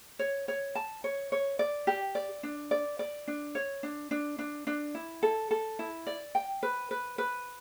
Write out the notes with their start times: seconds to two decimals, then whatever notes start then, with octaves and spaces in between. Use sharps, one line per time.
0.19 C#5
0.48 C#5
0.75 A5
1.04 C#5
1.32 C#5
1.59 D5
1.87 G4
2.15 D5
2.43 D4
2.71 D5
2.99 D5
3.28 D4
3.55 C#5
3.83 D4
4.11 D4
4.39 D4
4.67 D4
4.95 E4
5.23 A4
5.51 A4
5.79 E4
6.07 D5
6.35 G5
6.63 B4
6.91 B4
7.18 B4